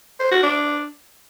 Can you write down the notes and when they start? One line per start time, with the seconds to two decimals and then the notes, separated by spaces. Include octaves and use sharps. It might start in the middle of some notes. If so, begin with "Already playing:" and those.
0.20 C5
0.31 F#4
0.43 D4